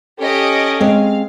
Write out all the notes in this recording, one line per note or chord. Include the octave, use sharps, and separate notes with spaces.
C#4 G4 A4 D#5 D7
G#3 C4 F5